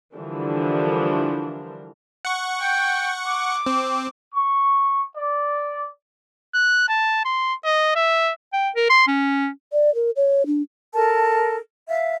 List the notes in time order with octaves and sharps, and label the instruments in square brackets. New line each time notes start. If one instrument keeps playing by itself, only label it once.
[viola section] D3 E3 F3 G3 D4 A#4
[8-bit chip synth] F#5 C#6
[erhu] G5
D6
[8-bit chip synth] C4
[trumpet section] C#6
D5
[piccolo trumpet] F#6
A5
C6
D#5
E5
[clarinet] G5
A#4
C6
C#4
[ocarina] D5
A#4
C#5
D4
[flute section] A4 A#4 A5
E5 F5